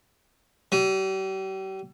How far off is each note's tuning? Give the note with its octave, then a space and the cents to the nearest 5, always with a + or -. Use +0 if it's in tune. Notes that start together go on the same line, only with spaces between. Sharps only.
G3 -40